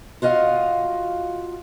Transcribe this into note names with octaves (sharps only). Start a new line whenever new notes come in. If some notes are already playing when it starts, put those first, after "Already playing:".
F4 F#4 D#5 F5